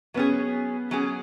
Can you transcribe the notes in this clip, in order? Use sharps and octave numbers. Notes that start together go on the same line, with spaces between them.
F#3 B3 C#4 G#4
F#3 C#4 G#4